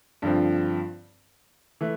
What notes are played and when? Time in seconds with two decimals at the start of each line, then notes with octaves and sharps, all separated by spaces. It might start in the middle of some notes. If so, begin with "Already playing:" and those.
0.22 G2 D3 F3 C4
1.81 E3 A3